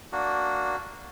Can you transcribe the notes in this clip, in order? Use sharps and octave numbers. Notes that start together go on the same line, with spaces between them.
A#3 D4 F#4